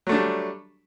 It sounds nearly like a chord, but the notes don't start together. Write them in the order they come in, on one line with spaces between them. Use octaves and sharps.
F#3 A3 D4 G3